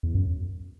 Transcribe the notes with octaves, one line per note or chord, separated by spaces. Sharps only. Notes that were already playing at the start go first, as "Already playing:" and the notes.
E2
F#2